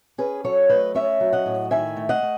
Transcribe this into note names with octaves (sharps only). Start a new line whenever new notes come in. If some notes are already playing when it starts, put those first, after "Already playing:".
C#4 G#4 B4
F#3 A4 C#5
A3 B4 D#5
C#4 C#5 E5
F#3
D#5 F#5
A2
D#3 E5 G#5
A3
D#5 F#5
A3